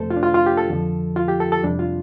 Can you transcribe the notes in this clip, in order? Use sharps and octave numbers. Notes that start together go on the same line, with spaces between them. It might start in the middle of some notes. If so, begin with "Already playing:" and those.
Already playing: F2 C3 A3 A4 C5
F4
D4
F4
F4
G4
A4
F2 D3 F3
F4
G4
A4
A4
F2 C3 G3 D4
F4